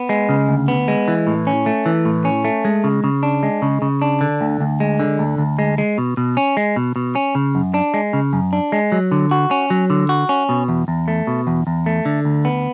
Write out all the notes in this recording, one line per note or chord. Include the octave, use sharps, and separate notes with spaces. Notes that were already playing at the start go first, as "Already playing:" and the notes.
Already playing: B3
G#3
C#3
D2
B3
G#3
E3
A2
C#4
A3
E3
A2
C#4
A3
G#3
C#3
C#3
D4
G#3
C#3
C#3
D4
D3
D2
D2
G#3
D3
D2
D2
G#3
G#3
B2
B2
C#4
G#3
B2
B2
C#4
C#3
F#2
D4
G#3
C#3
F#2
D4
G#3
F#3
D3
F#4
C#4
F#3
D3
F#4
C#4
B2
E2
E2
A3
B2
E2
E2
A3
D3
D2
B3